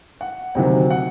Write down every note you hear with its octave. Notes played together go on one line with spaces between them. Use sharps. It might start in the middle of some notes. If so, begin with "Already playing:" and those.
F#5
D2 C3 D#3 F#3 G5
F#5